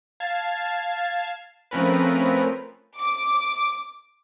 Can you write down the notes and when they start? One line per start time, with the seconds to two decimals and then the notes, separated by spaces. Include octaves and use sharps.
0.20 F5 A5 G#6 C7
1.71 F3 A3 C4 C#4 A#4 B4
2.97 D6